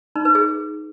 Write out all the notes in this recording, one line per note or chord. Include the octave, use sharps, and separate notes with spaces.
D#4
B4
G#4